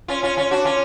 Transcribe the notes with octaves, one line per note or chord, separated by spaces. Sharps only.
C#4 F4
C#4 F4
C#4 F4
D4 F#4
C#4 F4